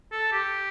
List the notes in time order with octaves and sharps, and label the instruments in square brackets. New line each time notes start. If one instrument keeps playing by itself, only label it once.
[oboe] A4
G4